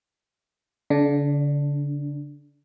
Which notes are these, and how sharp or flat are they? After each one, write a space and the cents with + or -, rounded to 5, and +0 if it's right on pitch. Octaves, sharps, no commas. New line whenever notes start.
D3 -40 D4 +0